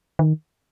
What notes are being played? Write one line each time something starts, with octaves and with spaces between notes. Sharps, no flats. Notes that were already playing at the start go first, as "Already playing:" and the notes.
D#3